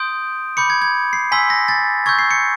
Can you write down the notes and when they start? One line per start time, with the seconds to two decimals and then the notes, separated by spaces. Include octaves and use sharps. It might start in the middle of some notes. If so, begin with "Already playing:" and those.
Already playing: C6 D#6 G6 D7
0.57 B5 D6 G6 C#7
0.70 G#6
0.82 G#6
1.13 C7
1.32 G#5 C6 E6 B6
1.50 A#6
1.68 A6
2.06 C#6 E6 G6 G#6
2.19 C7
2.31 C#7